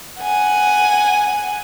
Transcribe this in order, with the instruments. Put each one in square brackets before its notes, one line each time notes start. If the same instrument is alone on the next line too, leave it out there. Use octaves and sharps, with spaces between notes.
[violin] F#5 G#5